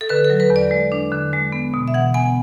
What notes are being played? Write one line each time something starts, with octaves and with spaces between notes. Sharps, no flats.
A4
D3 B4
A4
F#3
B4
E2
D5
G#3
D4
D3
G#3
B3
B2
E5
E3 F#5
B3 G#5